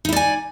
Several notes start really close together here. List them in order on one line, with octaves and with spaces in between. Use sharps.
D#4 E4 D5 G#5